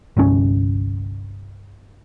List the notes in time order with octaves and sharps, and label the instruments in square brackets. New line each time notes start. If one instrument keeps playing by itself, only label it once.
[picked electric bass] G1 C2 G2 C#4